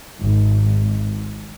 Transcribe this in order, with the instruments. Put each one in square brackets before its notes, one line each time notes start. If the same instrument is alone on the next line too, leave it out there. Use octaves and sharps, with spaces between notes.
[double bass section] G#1